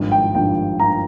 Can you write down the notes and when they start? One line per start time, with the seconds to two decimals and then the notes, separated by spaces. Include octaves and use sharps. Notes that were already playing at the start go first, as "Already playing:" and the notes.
Already playing: G#1 G2 F3
0.12 G5
0.35 G#1 G2 F3 G5
0.80 G2 F3 A#5